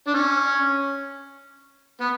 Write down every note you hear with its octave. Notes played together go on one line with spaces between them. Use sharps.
D4
C#4
B3